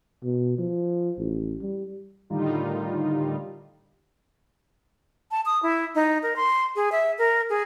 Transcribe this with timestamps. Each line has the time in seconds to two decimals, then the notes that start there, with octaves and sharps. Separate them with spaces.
0.24 B2
0.58 F3
1.19 A1
1.62 G3
2.30 A2 D3 D#3 G3 D#4 F4
5.31 A5
5.46 D#6
5.63 E4
5.95 D#4
6.23 A#4
6.36 C6
6.76 G#4
6.92 E5
7.18 A#4
7.50 G#4